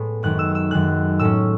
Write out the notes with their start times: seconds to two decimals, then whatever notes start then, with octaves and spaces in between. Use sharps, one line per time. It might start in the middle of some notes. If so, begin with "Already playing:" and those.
Already playing: A2 G#3 B3
0.23 F#2 D#3 G#3 F#6
0.39 E6
0.55 E6
0.71 F#2 D#3 G#3 F#6
1.19 A2 G#3 C#4 E6